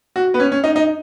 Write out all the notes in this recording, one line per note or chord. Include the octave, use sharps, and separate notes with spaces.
F#4
B3
C#4
C#4
D#4
D#4